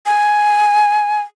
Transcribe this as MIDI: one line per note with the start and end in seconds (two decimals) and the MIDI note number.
0.06 1.21 80